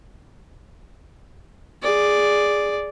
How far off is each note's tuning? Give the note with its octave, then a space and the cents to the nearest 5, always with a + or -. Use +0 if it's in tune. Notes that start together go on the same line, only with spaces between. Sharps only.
G#4 -5 D5 +0